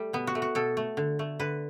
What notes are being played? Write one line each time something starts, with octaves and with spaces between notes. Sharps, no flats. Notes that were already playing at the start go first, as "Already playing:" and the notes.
Already playing: G3 A3
B2 B3
F#4
A3
F#4
B2 A4
A3
D3
A3
D3 B4